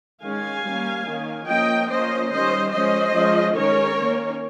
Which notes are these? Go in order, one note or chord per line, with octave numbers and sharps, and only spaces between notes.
D#3 G#3 C#4 F5 G#5
G3 A#3 C#4
D#3 A#3 C#4
F3 A#3 C#4 D#5 G5
F3 A#3 C#4 C5 D#5
D#3 G3 C#4 C5 D#5
F3 G#3 C#4 C5 D#5
F3 G#3 C#4
D#3 G#3 C#4 A#4 C#5
D#3 A#3 C#4